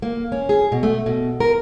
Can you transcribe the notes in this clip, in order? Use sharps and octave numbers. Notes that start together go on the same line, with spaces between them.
A#3
C#4
G#4
B2
A3
B2
A#4